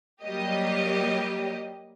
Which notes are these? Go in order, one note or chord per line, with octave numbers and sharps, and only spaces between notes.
F#3 G3 A#3 G4 D#5